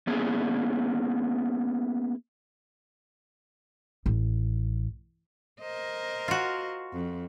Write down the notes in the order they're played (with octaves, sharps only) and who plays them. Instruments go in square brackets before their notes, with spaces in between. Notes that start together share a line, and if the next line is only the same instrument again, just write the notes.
[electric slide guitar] A#3 B3 C#4 E4 G#4
[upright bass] A1
[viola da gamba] A#4 C5 D#5
[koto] F4 F#4
[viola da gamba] F2